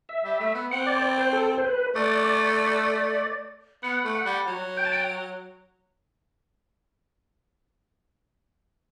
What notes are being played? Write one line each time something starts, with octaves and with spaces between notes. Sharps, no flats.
E5
G3
A3
B3
C4 F#5
D5
C5
D5
C5
A4
C5
B4
A3 D5
B3 F#5
A3
F#5
G3
F#3
G5
A5
G5